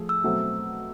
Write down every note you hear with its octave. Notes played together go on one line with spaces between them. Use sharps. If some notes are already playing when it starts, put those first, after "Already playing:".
Already playing: F3 A3 G#4
E6
B2 F#3 A3 C4